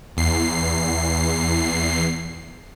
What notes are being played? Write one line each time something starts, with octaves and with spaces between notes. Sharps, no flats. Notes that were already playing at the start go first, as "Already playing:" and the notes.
E2 C7